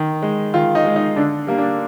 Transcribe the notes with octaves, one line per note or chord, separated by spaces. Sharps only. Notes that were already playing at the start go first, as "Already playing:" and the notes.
Already playing: D#3
G#3
D#3 F4
D#4
G#3
D#4
D3 D4
G3 A#3
D4